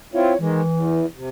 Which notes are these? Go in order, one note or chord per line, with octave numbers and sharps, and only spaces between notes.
C4 E4 F4 C#5
D#3 E3 G#3
E2
C3